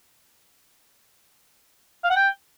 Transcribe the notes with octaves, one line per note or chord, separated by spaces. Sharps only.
F5
F#5
G5